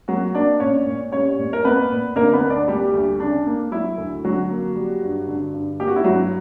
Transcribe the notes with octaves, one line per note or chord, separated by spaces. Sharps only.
F#3 A#3 F#4
A#3 D4 D5
A#2 C#4 C#5
A#2
G3 C#4 C#5
A#2
A#4
A#3 B3 B4
A#2
D3 A#3 A#4
B3 B4
D2
D4 D5
G3 A#3 G4
D2
C#3 D4
A#3
F#3 E4
D2
D3 F#3 F#4
A#3
G3
G2
D3
G2
A#3 G4
F#4
E4
G2 F#3 F#4